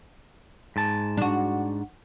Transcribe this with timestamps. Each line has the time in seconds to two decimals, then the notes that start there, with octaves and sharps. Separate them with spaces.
0.76 G#2 A5
1.17 D4 F#4